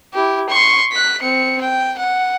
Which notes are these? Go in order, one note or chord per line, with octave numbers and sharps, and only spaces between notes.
E4 G4
C6 C#6
F#6 B6
C4 C#7
G5
F#5